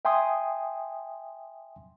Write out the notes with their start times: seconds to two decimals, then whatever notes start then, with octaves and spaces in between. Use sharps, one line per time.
0.05 E5 G5 G#5 C6 D#6